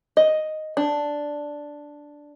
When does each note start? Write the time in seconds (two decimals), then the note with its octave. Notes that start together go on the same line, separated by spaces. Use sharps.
0.17 D#5
0.77 D4